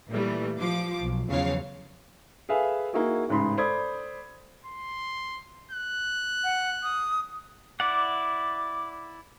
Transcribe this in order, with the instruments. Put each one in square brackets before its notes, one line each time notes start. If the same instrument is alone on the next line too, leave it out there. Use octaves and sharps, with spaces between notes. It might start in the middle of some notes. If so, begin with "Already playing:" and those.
[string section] A#2 E3 G3 A3
F3 D6
B1
E2 C#3 F3 F#3 C#5 F5
[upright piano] G#4 A4 B4 E5 F5 G#5
A#3 D#4 E4 F#4 G#4
A1 G#2 C#3 B5 C6
A4 C5 D5 B5 D#6 G#6
[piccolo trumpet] C6
F#6
[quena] F#5
D#6
[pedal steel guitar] E4 D5 F#5 [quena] D6